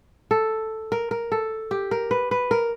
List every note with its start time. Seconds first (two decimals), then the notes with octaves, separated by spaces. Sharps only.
0.31 A4
0.92 A#4
1.11 A#4
1.32 A4
1.71 G4
1.91 A#4
2.11 B4
2.31 B4
2.51 A#4